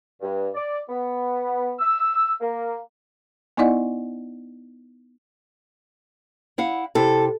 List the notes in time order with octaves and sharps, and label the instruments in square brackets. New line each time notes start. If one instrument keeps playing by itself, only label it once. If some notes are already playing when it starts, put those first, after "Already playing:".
[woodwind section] G2
D5
B3
E6
A#3
[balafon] B3 D#4 E4 D5 D#5 F#5
[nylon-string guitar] E4 F5 F#5
[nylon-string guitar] C3 E4 [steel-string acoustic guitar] A4